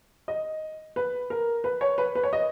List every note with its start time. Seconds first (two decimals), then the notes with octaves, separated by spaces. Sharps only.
0.28 D#5
0.96 B4
1.30 A#4
1.64 B4
1.81 C#5
1.98 B4
2.15 B4
2.23 C#5
2.33 D#5